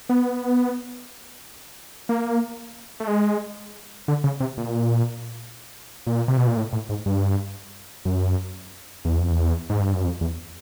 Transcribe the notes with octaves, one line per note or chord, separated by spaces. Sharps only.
B3
A#3
A3
G#3
D3
C#3
C3
A#2
A#2
C3
B2
A#2
A2
A2
G#2
G2
F#2
E2
F2
E2
G#2
G2
F#2
F2
E2